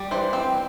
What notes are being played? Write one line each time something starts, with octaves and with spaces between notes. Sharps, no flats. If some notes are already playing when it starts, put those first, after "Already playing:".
Already playing: G3
E3 C5
C4